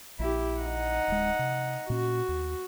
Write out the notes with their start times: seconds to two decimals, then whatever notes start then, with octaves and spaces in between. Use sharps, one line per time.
0.19 A#1 E4 G4
0.60 D#4 F#5
1.08 D1 G#3
1.39 C3
1.90 A#2 C#4 F#4
2.29 D#2